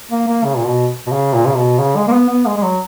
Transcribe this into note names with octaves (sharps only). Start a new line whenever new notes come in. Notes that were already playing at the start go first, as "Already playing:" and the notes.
A#3
A#3
C#3
A#2
B2
B2
C#3
A#2
C#3
B2
C#3
G#3
A#3
B3
B3
G#3
G#3
F#3